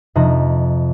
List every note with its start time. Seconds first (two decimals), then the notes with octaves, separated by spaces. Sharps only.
0.15 F2 C3 D#4 A#5